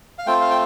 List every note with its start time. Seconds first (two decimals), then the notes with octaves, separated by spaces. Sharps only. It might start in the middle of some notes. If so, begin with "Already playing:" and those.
0.18 F5
0.27 A3 C4 F4 G5
0.41 F5
0.50 G5